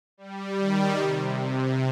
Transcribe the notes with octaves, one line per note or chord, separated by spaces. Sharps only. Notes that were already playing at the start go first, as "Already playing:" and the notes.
G3
D#3
C3
C3